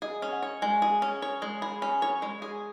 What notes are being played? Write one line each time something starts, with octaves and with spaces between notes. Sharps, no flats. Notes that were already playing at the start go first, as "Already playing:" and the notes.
G#4 D#5
C#4
F#5
C#5
G#3 G#5
G#4
C#4
C#5
G#3 D#6
G#4 B5
C#4 G#5
C#5
G#3
G#4